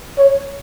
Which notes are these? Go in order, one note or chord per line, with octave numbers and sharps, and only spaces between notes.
C#5